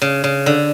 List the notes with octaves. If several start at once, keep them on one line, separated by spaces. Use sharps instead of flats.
C#3
C#3
D3